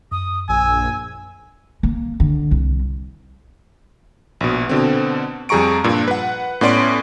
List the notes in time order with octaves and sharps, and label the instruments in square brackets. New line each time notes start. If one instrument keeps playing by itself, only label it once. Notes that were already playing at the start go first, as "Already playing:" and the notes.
[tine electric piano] F#2 [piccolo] D#6
[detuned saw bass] A#1 [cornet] G#5 [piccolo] E6
[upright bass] A#3
D3
C2
[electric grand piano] A#1 B2
B2 D3 C4
F2 G3 G#4 A#5 C#6 D7
G2 A#2
B4 F#5
A2 B3 C#4 D5 C6 D7